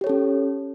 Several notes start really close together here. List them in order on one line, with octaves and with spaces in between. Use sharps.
G4 C#5 A4 C#4